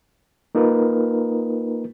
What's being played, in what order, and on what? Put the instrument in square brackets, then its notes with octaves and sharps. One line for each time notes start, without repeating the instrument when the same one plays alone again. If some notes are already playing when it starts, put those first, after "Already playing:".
[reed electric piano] A#3 D#4 F4 A#4 B4